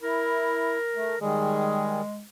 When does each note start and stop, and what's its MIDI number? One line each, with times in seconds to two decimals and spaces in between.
0.02 0.78 64
0.02 1.19 70
0.96 1.15 57
1.21 2.01 51
1.21 2.01 55
1.21 2.23 56
1.21 2.01 68